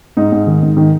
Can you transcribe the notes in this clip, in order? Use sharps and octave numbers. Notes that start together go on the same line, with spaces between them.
G#2 D#4
G#2
D#3
G#2
D#3